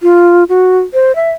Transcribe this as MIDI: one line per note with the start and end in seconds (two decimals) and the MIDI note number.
0.02 0.44 65
0.49 0.79 66
0.94 1.15 72
1.16 1.31 76